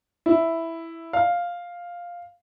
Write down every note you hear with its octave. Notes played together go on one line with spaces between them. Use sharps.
E4
F5